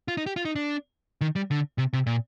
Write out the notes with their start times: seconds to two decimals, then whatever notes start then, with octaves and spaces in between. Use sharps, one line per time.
0.08 F4
0.17 D#4
0.26 G4
0.36 F4
0.45 D#4
0.56 D4
1.21 D#3
1.36 G3
1.51 D3
1.78 C3
1.93 C3
2.06 A#2